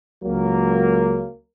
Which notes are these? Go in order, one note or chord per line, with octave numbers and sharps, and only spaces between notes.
C#2 F#3 A#3 A#4